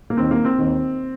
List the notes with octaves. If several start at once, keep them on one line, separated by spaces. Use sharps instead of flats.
A#3
D#2 D#3 C4
A#3
C4
D#2 D#3